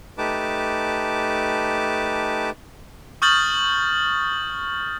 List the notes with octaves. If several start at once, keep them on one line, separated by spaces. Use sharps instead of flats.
A3 D#4 G4 B4 A5 D6
C#6 D#6 F6 G6 A6 F#7